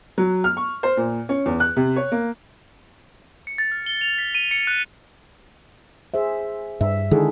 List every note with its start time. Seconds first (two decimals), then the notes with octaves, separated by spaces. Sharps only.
0.18 F#3
0.44 F6
0.57 C#6
0.83 C5
0.97 A#2
1.29 C#4
1.46 E2
1.60 F#6
1.77 C3
1.96 C#5
2.12 A#3
3.47 C#7
3.58 A6
3.71 F6
3.86 G7
4.01 F7
4.18 B6
4.35 D#7
4.51 C#7
4.67 F#6
6.14 G#4 C5 E5
6.81 G2 E5
7.11 D3 D#3 G#3 E4 G#4 A4